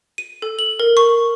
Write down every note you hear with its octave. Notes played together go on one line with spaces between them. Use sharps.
D#7
A4
F#7
A#4
C#6